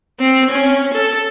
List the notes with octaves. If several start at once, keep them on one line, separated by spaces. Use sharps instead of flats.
C4
C#4
A4